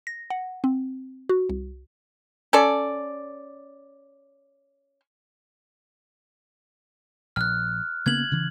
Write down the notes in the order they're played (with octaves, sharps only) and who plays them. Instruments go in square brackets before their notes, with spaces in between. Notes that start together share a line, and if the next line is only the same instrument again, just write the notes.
[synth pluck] A#6
F#5
C4
F#4
C2
[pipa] C#4 A4 D5
[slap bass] A#1 [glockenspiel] F6 F#6
[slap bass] C#3 A#3 B3 [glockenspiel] G#6 F#7
[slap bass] C#3 E3